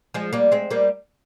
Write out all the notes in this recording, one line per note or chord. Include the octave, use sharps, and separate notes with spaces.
F3 G#3
G3 A#3
G#3 C4
G3 A#3